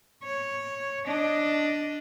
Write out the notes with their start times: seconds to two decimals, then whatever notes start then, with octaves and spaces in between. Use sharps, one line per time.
0.24 C#5
1.05 D4 D#5